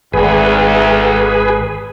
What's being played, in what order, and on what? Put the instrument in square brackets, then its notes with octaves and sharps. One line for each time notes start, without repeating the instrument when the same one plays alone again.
[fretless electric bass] G#1 [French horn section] D2 [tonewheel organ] G#4 B4